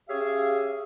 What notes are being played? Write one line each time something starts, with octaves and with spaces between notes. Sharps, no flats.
C#4 G4 G#4 C#5 E5 F5